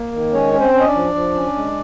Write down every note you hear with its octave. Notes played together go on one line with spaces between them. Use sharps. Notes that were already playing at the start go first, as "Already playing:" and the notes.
Already playing: A#3
D#3
G#3 C#4 C#5
C#4
C4 C5
C#4
D#5
D4 D5
F3
F3
C#4
G#3